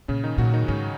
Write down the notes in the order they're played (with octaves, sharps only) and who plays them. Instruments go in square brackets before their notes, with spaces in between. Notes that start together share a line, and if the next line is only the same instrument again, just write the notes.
[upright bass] A#2 [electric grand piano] C#3 C#4
[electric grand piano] D#3 D#4
[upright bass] A#2 [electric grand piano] F#3 F#4
[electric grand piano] D#3 D#4
[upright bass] G#2 [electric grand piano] C#3 C#4